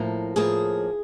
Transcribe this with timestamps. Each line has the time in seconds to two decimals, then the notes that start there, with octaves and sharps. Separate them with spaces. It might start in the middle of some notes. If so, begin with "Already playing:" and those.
Already playing: A2 F3 A#3
0.36 A2 F3 A#3 G#4